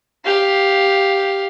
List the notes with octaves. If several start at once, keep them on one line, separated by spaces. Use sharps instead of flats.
G4 F5